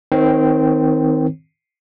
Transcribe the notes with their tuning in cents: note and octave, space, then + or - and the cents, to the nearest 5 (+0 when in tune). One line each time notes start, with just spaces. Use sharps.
D#3 +15 C4 -15 C#5 -35